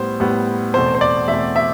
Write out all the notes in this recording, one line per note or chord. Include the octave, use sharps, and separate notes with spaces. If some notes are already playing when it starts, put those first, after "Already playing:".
Already playing: A2 G3 B3 C5
A2 G3 B3
E2 B2 A3 C4 C5
C5
D5
E2 B2 A3 C4 E5
E5